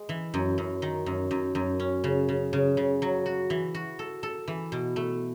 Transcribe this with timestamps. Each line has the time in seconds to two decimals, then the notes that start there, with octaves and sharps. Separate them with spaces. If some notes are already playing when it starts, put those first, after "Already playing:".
Already playing: G#3
0.09 E3
0.34 F#2
0.58 F#2
0.82 D#3
1.06 F#2
1.31 F#2
1.55 F#2
1.80 C#4
2.04 C#3
2.29 C#3
2.53 C#3
2.77 C#3
3.02 F#3
3.26 F#4
3.50 E3
3.75 F#4
3.99 A4
4.23 A4
4.48 E3
4.72 B2
4.96 A3